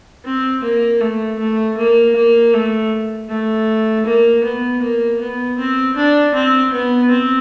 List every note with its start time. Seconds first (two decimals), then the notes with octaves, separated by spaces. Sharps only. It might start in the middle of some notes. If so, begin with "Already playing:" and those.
0.24 C4
0.63 A#3
1.00 A3
1.39 A3
1.77 A#3
2.15 A#3
2.53 A3
3.29 A3
4.06 A#3
4.44 B3
4.82 A#3
5.20 B3
5.58 C4
5.96 D4
6.34 C4
6.72 B3
7.10 C4